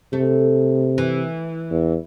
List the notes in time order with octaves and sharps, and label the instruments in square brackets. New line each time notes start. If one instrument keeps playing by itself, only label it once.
[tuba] C3 [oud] A3
[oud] E3
[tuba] E2